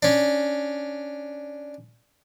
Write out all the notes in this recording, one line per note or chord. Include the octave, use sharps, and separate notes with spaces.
C#4 D4